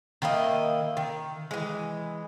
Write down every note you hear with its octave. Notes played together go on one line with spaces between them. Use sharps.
D#3 A#3 E4 D#5
D#3
E3 G#3